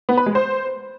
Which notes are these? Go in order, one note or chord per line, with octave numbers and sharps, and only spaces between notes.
B3
B4
G#3
C5